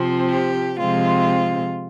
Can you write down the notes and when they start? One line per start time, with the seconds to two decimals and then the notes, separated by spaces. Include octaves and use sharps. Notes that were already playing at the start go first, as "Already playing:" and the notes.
Already playing: C3 F3 C4
0.29 G4
0.78 C3 F3 G#3 C4 F4